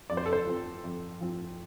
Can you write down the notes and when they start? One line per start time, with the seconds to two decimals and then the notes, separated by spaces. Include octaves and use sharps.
0.10 F2 D5
0.17 C5
0.26 A4
0.33 C5
0.46 F3 C4
0.84 F2
1.21 F3 C4